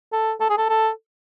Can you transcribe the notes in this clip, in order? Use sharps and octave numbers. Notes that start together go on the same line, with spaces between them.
A4
A4
G#4
A4
A4